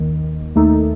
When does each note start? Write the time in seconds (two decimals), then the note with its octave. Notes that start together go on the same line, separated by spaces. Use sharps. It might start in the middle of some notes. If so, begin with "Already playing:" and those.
Already playing: D#2 D#3
0.56 D#2 D#3 A3 D#4 A4